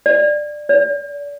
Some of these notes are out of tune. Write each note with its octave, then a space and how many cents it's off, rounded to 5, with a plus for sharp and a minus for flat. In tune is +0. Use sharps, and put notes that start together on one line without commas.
D5 +15
D5 -35